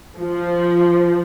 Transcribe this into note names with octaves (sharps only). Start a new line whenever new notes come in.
F3